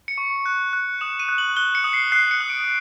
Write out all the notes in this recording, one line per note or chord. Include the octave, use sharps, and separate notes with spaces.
C#7
C#6
F#6
F#6
D#6 E7
D#7
F#6
F#7
F#6 G7
C#7
D#6
C7
F#6 C7
C#7
D#6
D7